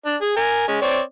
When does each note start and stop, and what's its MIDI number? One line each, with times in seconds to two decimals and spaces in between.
0.05 0.16 62
0.21 0.33 68
0.36 0.66 70
0.36 0.66 80
0.68 0.80 56
0.68 0.80 61
0.82 1.00 60
0.82 1.00 73
0.82 1.00 74